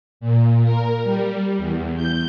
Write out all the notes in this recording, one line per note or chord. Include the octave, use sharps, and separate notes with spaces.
A#2
A#4
G3
E2
G6